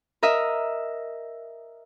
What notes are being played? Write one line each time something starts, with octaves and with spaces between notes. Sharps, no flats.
A#4 D#5 E5